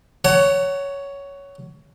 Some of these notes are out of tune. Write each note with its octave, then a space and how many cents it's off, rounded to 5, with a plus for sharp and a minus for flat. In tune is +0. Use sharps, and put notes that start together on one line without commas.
C#5 +10 F#5 +20 A#5 -40